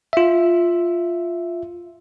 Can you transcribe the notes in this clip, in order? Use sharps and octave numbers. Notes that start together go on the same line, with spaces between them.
F4 E5